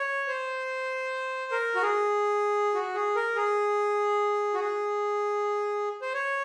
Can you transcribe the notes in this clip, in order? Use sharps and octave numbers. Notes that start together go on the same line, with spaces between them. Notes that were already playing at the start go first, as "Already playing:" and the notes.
Already playing: C#5
C5
A#4
F#4
G#4
F#4
G#4
A#4
G#4
F#4
G#4
C5
C#5